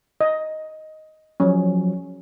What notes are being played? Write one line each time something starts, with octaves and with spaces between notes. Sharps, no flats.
D#5
F3 F#3 C#4